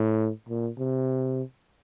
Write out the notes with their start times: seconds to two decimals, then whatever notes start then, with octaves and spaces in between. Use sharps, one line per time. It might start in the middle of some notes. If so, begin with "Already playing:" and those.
Already playing: A2
0.49 A#2
0.78 C3